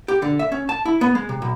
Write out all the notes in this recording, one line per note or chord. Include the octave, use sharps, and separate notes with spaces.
G4
D3
E5
C#4
A5
E4
B3
G#3
C3
B1